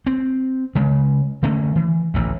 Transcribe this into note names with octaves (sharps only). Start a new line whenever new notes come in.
C4
C#3 G#3
D3 A3 A#3 C#4
E3
A1 D2